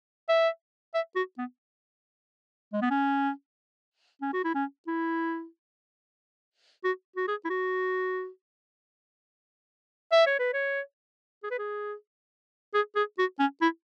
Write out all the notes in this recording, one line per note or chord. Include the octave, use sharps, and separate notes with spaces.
E5
E5
F#4
B3
G#3
B3
C#4
C#4
F#4
E4
C#4
E4
F#4
F#4
G#4
E4
F#4
E5
C#5
B4
C#5
G#4
B4
G#4
G#4
G#4
F#4
C#4
E4